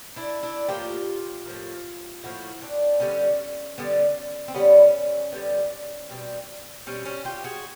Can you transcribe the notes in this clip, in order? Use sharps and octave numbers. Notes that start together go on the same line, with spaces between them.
D4 E4
D4 E4
A2 F3 A#3 F4 G4
A2 F3 A#3
A2 F3 A#3 E4 F#4
C4 D4
D3 G3 B3 C#4
D3 G3 B3
C4
D3 G3 B3 C#4
D3 G3 B3
B2 G3 C4
B2 G3 C4 C#4
C#4
F4 G4
F#4 G#4